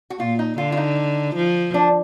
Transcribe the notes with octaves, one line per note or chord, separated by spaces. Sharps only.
F#4
A#2 F4
D#4
D3 F4
F4
D#4
F3
D4